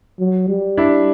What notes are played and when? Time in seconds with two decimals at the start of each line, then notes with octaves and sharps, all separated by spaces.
0.19 F#3
0.48 G3
0.77 D4 E4